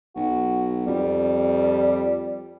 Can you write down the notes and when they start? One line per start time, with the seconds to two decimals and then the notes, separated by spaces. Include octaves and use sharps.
0.16 B1 F#4
0.87 F2 G3